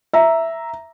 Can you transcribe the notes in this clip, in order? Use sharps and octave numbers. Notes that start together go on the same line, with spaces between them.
E5 A#5